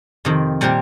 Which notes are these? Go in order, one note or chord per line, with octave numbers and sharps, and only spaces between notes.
F2 C3 D#3
A#2 G3 C4 G4 A#4